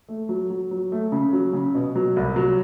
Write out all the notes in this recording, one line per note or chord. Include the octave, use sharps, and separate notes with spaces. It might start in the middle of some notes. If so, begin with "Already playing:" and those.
A3
F#3
F#3
F#3
A3
C#3
F#3
C#3
B2
F#3
C2
F#3